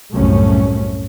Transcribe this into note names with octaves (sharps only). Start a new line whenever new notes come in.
C2 F#2 A2 A3 C#4